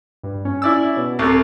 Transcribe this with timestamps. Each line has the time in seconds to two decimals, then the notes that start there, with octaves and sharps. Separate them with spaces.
0.23 G2
0.45 C#4
0.62 E4 D5 E6
0.97 B2
1.19 C2 C3 A4